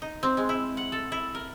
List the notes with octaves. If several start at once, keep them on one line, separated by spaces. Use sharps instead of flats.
D#4
C4
G#3
E4
F#5
A4
E4
A#4